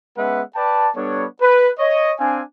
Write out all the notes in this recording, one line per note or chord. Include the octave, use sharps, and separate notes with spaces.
G#3 B3 C#4 B4 E5 F#5
B4 D5 G5 A5
G3 B3 D4 A4 C#5
B4
C#5 D#5
C4 D4 F5 G#5